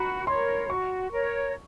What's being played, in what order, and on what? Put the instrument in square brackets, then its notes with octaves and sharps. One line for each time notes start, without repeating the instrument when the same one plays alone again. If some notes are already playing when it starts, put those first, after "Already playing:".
Already playing: [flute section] F#4 [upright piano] A#5 B5
[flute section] A#4 C#5 [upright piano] C6
[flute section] F#4 [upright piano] C#6
[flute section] A#4 C#5